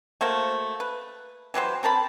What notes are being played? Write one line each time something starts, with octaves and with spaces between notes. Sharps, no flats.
A3 A#3 F#4 C5
B4
E3 F#3 G4 C5
C4 A#4 A5 B5